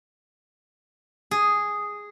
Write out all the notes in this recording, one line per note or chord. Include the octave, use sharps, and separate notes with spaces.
G#4